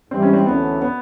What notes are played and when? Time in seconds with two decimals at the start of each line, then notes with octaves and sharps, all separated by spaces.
0.11 G#2 E3 G3 C4
0.22 C#4
0.33 C4
0.46 D2 C#3 E3 A3 B3 C#4
0.82 B3